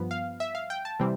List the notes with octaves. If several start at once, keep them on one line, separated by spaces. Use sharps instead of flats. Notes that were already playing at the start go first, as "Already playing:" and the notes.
Already playing: G2 F3 B3
F5
E5
F5
G5
A5
C3 E3 G3 C4